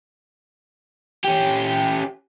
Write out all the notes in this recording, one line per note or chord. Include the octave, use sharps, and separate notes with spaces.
C#4 G4